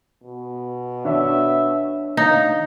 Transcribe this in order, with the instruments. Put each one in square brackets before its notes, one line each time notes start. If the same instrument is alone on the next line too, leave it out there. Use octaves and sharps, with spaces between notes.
[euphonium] B2
[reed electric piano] D4 C#5 [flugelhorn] E5
[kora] D#4 [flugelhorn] F5